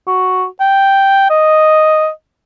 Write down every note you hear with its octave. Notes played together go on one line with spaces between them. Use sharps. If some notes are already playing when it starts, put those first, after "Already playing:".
F#4
G5
D#5